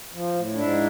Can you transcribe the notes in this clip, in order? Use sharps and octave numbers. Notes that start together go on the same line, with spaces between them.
F3
A2
G#2 D4 E4